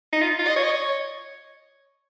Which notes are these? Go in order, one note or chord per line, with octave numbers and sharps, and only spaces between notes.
D#4
F4
F4
D#5
C#5
D#5
C#5